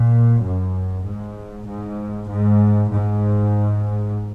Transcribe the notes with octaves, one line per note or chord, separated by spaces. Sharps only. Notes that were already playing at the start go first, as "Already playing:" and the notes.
Already playing: A#2
F#2
G#2
G#2
G#2
G#2